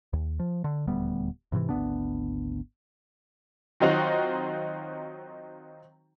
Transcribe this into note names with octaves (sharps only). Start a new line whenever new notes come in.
D#2
F3
D3
D#1 D2 G3 B3
D2 G#2 C3 E3
G#1 D2 B3 D4
D#3 F#3 C4 D#4 F4 F#4